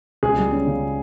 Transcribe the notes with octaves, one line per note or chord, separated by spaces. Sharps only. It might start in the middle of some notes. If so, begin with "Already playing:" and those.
C#2 G#4
G3
C#4
C#3